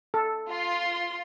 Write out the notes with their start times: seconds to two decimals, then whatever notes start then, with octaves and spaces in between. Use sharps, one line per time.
0.14 A4
0.49 F4 C6